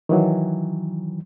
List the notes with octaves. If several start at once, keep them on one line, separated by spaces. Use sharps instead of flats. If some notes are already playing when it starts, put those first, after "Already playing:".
D#3 E3 F#3